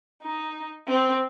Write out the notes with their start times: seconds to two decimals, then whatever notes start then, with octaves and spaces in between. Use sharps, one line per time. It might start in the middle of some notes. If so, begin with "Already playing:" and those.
0.23 D#4
0.88 C4